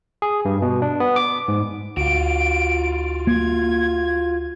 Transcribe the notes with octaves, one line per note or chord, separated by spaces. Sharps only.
G#4
G2
B2
D4
B3
D6
G#2
D2 F4 F#4 D7
A#3 G#6